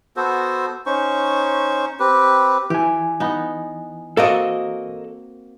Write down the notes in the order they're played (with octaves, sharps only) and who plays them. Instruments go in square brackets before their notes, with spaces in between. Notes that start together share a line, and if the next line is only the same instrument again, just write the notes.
[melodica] B3 F#4 A4 C5
C#4 D#4 C5 C#6
C4 G4 B4
[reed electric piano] E3 G#5 [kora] G4
[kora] B3 D#4
[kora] A#3 C4 F#4 [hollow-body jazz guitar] A4 A#4 D#5